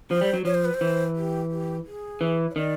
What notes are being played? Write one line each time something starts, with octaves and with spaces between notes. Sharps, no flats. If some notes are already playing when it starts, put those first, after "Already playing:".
F3 C5
G3
F#3
F3 C#5
C5
B4
C5
E3
G4
G4
G#4
E3
C#5
D#3 D5